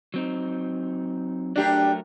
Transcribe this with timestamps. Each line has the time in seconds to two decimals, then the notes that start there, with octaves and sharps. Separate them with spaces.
0.14 F#3 C4 D#4
1.56 F#3 A3 D4 G4 A#4